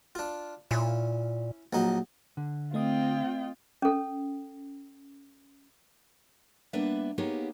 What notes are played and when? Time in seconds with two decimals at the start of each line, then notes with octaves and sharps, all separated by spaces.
0.15 D4 F4
0.71 A#2 C#4 E4
1.73 A#1 F#3 D#4
2.37 D3
2.74 A3 C4 F4 D#5 G5 D#6
3.82 C#4 A4
6.73 G3 A#3 B3 D4 B4 E5
7.18 A#3 B3 D#4 G4 G#4 C#5